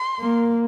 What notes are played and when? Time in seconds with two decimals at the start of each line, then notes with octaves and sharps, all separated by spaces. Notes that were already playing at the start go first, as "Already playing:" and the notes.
Already playing: C6
0.20 A#3